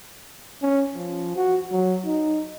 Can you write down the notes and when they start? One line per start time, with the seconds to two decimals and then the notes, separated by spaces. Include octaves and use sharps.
0.62 C#4
0.95 F3
1.37 F#4
1.72 F#3
2.05 D#4